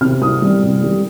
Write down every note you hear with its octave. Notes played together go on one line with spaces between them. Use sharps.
C3 F6
C2 D#6
G3
C2
G3